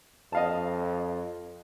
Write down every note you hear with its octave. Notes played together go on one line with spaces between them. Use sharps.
F2 D#5 F5 A5